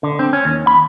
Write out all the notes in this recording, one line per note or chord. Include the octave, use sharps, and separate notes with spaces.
D3
C4
C#4
D#2
B5